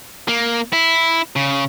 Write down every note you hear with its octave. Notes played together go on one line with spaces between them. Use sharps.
A#3
E4
C#3